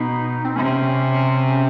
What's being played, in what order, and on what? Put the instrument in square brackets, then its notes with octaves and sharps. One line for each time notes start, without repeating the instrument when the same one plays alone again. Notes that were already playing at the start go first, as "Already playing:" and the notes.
Already playing: [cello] B2 [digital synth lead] D#4
[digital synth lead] C4
[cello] C3 [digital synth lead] C#4